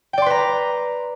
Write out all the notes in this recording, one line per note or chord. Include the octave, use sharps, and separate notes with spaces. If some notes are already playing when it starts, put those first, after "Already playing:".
B4 D5 G5 A#5 C6